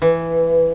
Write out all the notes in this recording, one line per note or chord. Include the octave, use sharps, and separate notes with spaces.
E3